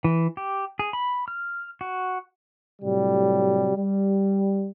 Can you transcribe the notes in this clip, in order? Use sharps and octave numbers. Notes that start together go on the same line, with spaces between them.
E3
G4
G#4
B5
F6
F#4
A2 C3 F#3 G3
G3